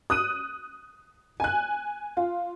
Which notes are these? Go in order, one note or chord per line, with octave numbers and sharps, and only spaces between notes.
D#6 F#6 D#7
G#5 F#6
F4